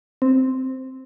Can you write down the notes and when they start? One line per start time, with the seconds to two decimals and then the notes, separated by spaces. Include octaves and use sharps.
0.22 C4